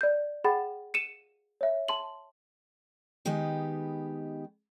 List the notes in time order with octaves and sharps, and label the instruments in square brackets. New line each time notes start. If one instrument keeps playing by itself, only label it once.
[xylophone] D5 G6
G#4 F#5 G5 B5 A6
C#7 D#7 E7
C#5 E5
A5 C6 F#7
[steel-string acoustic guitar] D#3 G#3 B3 D#4 G4 B4